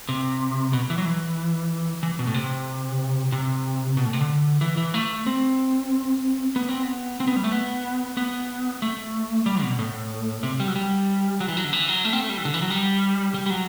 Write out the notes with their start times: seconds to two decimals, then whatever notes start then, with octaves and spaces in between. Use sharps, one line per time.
0.09 C3
0.73 B2
0.90 E3
0.98 F#3
1.06 E3
2.03 E3
2.19 B2
2.27 A2
2.34 C3
3.32 C3
3.97 B2
4.05 A2
4.13 C3
4.21 D3
4.61 E3
4.77 E3
4.94 A3
5.26 C4
6.56 B3
6.69 C4
6.83 B3
7.20 C4
7.27 B3
7.36 G3
7.44 A3
7.52 B3
8.17 B3
8.82 A3
9.46 G3
9.62 B2
9.79 A2
10.43 C3
10.60 G3
10.68 F#3
10.75 G3
11.40 F#3
11.48 E3
11.57 F#3
11.64 D3
11.73 E3
11.89 F#3
12.05 A3
12.13 C4
12.21 A3
12.29 G3
12.38 E3
12.45 D3
12.54 E3
12.62 F#3
12.70 G3
13.34 G3
13.46 G3
13.50 F#3